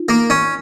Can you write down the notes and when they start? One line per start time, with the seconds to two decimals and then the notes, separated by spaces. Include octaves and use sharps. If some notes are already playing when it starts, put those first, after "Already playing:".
Already playing: D#4 F4
0.09 A#3
0.30 C#4